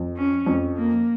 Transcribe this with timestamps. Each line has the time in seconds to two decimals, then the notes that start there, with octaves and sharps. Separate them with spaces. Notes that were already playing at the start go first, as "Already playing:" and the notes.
Already playing: F2
0.17 C#4
0.46 F2
0.77 A#3